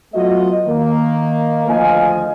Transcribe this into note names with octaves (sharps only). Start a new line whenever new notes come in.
F#3 A3 B3 F4 F#4 D#5
D#3 A#3
D2 D#3 F3 D#5 F5 G#5